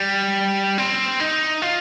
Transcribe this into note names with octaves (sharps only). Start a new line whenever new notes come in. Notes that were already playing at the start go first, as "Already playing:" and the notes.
Already playing: G3
C4
D#4
F4